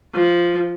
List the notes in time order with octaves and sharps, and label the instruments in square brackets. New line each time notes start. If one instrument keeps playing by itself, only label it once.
[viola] F3